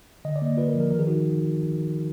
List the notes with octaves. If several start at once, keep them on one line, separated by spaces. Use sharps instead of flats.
D3 D#5
D5
A#3 D#5
F4 B4
A#4
F3
A#4
D#3 A#4
G#4
D#4 F#4